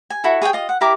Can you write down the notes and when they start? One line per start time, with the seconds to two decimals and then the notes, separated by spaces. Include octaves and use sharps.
0.10 G#5
0.24 E4 F#4 A4
0.42 G#4 C#5 F#5 G5
0.53 F4 D#5
0.69 F#5
0.81 E4 G4 A#4 D6